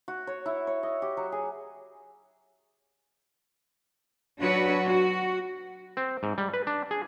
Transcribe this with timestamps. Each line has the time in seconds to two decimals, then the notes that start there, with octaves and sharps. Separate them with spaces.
0.08 F#4
0.27 C#5
0.46 E4
0.67 C#5
0.83 D#5
1.02 G4
1.17 F#3
1.32 G#4
4.40 F#3 D4 F#4 B4 C#5
4.87 F#4
5.97 C4
6.23 G#2
6.38 G3
6.54 B4
6.67 D4
6.91 G#4